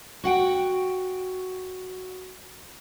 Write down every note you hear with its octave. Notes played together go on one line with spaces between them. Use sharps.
F#4 F#5 G5